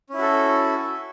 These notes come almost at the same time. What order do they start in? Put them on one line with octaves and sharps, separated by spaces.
C#4 E4 F#4 A4